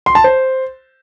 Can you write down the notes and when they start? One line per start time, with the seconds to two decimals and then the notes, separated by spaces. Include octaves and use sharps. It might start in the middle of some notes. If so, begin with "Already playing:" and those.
0.06 C6
0.15 A5
0.24 C5